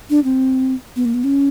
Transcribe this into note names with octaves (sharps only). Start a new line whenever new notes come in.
D4
C4
B3
A#3
B3
C#4